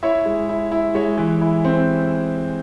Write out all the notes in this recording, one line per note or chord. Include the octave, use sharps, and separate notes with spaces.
E4 C#5 E5
G#3
E4
E4
G#3 C#5 E5
E3
E4
C4